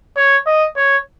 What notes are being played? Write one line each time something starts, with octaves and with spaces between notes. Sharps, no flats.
C#5
D#5
C#5